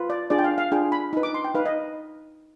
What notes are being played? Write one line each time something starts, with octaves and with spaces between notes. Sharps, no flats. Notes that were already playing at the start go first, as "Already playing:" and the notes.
Already playing: F4 B4
D5
D4 F4 G#4 D5
G5
F5
F5
D4 F4 G#4 G5
B5
D#4 B4
D6
C6
G5
D#4 B4 F5
D#5